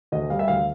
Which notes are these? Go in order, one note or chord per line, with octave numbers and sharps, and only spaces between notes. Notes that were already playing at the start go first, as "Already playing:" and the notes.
D2 D#5
G3 F5
E5
D2 F5